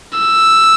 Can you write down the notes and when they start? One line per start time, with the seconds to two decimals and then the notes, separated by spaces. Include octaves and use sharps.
0.18 E6